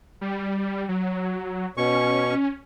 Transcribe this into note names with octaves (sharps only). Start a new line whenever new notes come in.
G3
F#3
B2 C#4 C#6